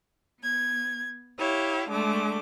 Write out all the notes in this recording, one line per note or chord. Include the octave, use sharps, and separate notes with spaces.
B3 G#6
E4 G4 C#5 F5
D3 G#3 A3 D6